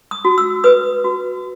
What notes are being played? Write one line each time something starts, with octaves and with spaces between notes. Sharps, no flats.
D#6
F#4
E6
B4 D#6
F#4